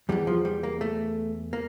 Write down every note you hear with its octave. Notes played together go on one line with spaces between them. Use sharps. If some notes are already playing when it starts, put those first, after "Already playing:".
E2 E3 G3
F3
G3
A#3
A3
A#3